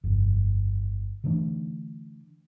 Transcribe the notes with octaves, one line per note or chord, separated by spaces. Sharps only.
G1 F2
D3 E3 A3 D4